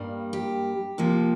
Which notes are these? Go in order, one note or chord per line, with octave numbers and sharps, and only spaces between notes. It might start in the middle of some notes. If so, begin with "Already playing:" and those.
Already playing: G2 G3 A#3
G4
C3 F3 A#3